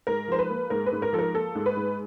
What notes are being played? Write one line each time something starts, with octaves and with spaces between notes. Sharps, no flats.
G#2 A#4
F3 C5
B4
A#3
G#2 A#4
B4
G#2
A#4
F3 A4
A#4
A#3 A4
G#2
B4
G#2